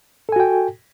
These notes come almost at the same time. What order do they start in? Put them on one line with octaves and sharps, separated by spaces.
A4 G#5 F#4 G5